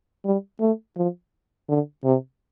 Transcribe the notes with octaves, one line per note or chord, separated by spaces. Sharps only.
G3
A3
F3
D3
C3